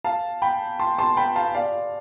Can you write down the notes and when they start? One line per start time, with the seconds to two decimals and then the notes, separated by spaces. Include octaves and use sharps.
0.04 F5 A5
0.42 G5 B5
0.79 A5 C6
0.99 A5 C6
1.17 G5 B5
1.36 F5 A5
1.55 D5 F5